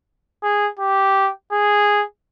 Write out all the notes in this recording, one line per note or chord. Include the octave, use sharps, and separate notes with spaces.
G#4
G4
G#4